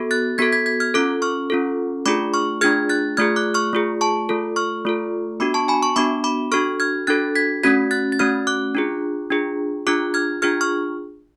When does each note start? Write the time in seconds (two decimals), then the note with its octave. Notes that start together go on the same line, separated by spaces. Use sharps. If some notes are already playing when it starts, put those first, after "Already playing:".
Already playing: B3 F#4 A4
0.11 F#6 A6
0.38 B3 F#4 A4 G#6 B6
0.52 G#6 B6
0.66 G#6 B6
0.80 F6 G#6
0.94 C#4 F4 A4 D6 F#6
1.22 C#6 F6
1.50 C#4 F4 A4
2.06 A3 D4 F4 G#4 B5 D6
2.34 C#6 F6
2.61 A3 D4 F4 G#4 F6 G#6
2.89 F#6 A6
3.17 A3 F4 G#4 F6 G#6
3.36 D6 F#6
3.54 C#6 F6
3.73 A3 F4 G#4
4.01 A5 C#6
4.29 A3 F4 A4
4.56 C#6 F6
4.85 A3 F4 A4
5.40 B3 D4 F#4 B5 D6
5.54 A5 C#6
5.68 G#5 B5
5.82 A5 C#6
5.96 B3 D4 F#4 B5 D6
6.24 B5 D6
6.52 D4 F#4 A4 C#6 F6
6.80 F6 G#6
7.07 D4 F#4 A4 F#6 A6
7.35 G#6 B6
7.63 A3 C#4 F#4 G#6 B6
7.91 F#6 A6
8.12 A6
8.19 A3 C#4 F#4 F6 G#6
8.47 D6 F#6
8.75 D4 F4 G#4
9.30 D4 F4 G#4
9.87 D4 F4 G#4 D6 F#6
10.14 F6 G#6
10.42 D4 F4 G#4 F6 G#6
10.61 C#6 F6